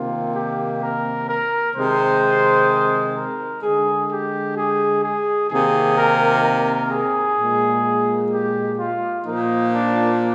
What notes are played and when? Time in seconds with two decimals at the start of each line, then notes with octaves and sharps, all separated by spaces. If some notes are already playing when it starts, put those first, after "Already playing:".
Already playing: C3 D#3 A#3 F4
0.35 G4
0.82 A#4
1.28 A#4
1.75 C3 D#3 G#3 C5
3.17 A#4
3.63 D3 G#3 G#4
4.10 G4
4.56 G#4
5.03 G#4
5.50 C3 D#3 A#3 G#4
5.97 A#4
6.43 A#4
6.91 G#4
7.37 A#2
7.42 G#3
8.31 G4
8.78 F4
9.25 A#2 F3 A#3 D#4
9.72 D4